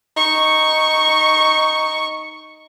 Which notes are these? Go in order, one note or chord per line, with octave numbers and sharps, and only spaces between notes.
D#4 C#6